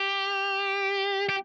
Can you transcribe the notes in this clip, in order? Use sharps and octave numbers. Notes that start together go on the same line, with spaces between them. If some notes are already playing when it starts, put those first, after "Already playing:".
Already playing: G4
G4